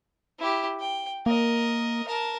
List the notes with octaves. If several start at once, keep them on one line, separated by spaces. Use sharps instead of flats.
E4 G4
G5
A#3 A#4 D#5
A#4 A5